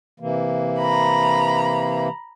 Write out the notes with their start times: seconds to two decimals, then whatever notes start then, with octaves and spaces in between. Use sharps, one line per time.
0.20 C3 E3 A#3
0.77 A#5 B5